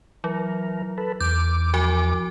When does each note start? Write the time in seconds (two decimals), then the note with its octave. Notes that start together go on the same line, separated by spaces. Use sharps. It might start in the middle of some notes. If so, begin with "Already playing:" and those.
0.24 E3 F#3 A#4
0.98 A4 B4
1.20 E2 D6 G6
1.74 F3 F#4 G#5